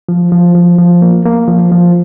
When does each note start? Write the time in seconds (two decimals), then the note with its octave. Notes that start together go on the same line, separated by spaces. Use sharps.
0.09 F3
0.32 F3
0.55 F3
0.78 F3
1.02 A#3
1.26 A#3
1.48 F3
1.72 F3